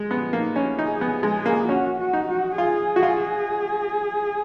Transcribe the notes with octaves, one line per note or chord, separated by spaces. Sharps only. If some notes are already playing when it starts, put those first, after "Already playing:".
Already playing: G#3
B3
A#3 D#4
C#4
D#4 G#4
B3
G#3 G#4
A#3
C#4 F#4
F#4
D#4
F#4
F4 G#4
F#4
F4